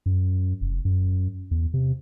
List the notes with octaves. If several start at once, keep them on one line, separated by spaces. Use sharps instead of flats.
F#2
F1
F#2
E2
C3